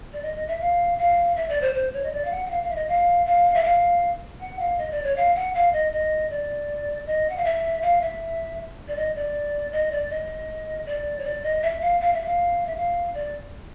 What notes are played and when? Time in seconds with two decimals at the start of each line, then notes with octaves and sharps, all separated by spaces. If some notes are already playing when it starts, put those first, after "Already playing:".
0.13 D5
0.22 D#5
0.35 D#5
0.47 E5
0.60 F5
0.98 F5
1.36 E5
1.49 D5
1.61 C5
1.74 C5
1.93 C#5
2.04 D#5
2.12 D5
2.25 F5
2.31 F#5
2.46 F#5
2.50 F5
2.63 F5
2.70 E5
2.76 D#5
2.88 F5
3.26 F5
3.55 E5
3.64 F5
4.40 F#5
4.59 F5
4.78 D#5
4.91 D5
5.04 C#5
5.16 F5
5.35 F#5
5.54 F5
5.73 D#5
5.92 D#5
6.30 D5
7.06 D#5
7.30 F#5
7.37 F5
7.44 E5
7.82 F5
8.02 E5
8.88 D5
8.96 D#5
9.15 D5
9.72 D#5
9.92 D5
10.10 D#5
10.86 D5
11.19 C#5
11.24 D5
11.43 D#5
11.62 E5
11.81 F5
12.01 F5
12.13 E5
12.25 F5
12.66 E5
12.76 F5
13.14 D5